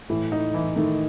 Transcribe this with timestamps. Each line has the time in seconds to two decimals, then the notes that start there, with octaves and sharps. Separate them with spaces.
0.09 A2 E3
0.32 D#4
0.54 E3
0.76 D#3 A3